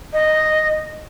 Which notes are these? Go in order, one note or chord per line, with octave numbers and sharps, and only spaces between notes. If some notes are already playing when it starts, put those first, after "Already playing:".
D#5